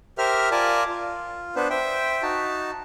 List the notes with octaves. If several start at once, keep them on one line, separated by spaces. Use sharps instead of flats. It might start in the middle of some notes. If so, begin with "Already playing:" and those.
G4 A#4 C5 E5 F6
F4 A#4 D5 G#5 A5
F4
B3 D4 B4 C5
C5 E5 G5
D#4 F#4 A5